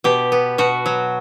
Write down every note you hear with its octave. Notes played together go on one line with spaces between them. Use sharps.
B2 G4
B3
B2 F#4
F#3